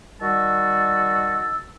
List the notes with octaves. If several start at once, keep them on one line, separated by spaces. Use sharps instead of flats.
D#3 G3 F#4 A5 E6